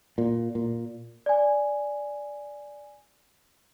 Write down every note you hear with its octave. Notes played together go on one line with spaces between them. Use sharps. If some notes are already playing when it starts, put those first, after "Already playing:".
A#2
A#2
D5 G#5